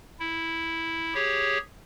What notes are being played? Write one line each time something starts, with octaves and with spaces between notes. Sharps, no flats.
E4
G4 G#4 C#5